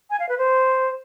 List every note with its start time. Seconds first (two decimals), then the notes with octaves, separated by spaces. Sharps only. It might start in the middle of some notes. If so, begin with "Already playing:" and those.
0.10 G#5
0.20 F5
0.29 B4
0.38 C5